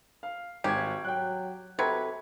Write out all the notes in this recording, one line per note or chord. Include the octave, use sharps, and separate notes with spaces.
F5
G#1 G4 G#5 G#6
F#3 G5 F#6
C3 F#3 A4 B4 G#6